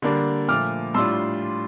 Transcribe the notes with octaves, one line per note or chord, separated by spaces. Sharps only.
D3 G3 A#3 D4
A#2 F3 A3 D6 F6
A2 G3 D4 F4 C6 E6